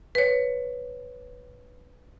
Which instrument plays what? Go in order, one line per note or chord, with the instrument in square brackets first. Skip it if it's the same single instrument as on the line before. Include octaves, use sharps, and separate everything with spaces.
[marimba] B4 C#5